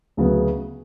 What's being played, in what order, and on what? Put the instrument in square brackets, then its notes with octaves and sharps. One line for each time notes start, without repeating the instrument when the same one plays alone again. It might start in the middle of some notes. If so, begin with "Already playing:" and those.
[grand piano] D2 C#3 F#3 B3